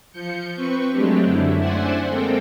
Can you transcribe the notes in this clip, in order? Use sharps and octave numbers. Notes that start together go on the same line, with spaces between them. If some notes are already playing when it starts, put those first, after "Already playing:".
F3 G6 C#7
C4 B4 C#6
F#3 G#3 A3 C4 D4 G4
F#2 D3 A3 E4
C5 D5 E5 F#5 G#5 C6
G#3 A#3 C4 A4 G5